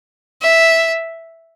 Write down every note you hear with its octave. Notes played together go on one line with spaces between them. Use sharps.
E5